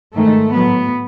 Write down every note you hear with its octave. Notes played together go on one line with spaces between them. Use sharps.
G#2 D#3 G#3 A3
A2 F#3 B3